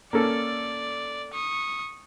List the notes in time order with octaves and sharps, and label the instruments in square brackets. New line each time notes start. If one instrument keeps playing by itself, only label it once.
[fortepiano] A#3 C#4 A4 [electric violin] D5
[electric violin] C#6 D#6